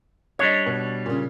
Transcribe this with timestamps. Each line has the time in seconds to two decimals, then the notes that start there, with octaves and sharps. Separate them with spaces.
0.39 G3 D4 C#5 D#5 G#6
0.66 B2
1.06 A#2 C#3